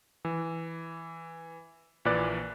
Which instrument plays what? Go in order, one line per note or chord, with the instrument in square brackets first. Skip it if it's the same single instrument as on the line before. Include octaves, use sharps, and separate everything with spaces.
[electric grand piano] E3
A#1 A#2 E3 B4 D5 F#6